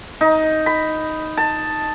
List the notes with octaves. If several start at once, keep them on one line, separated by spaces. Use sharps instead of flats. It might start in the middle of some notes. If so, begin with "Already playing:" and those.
D#4
B5
A5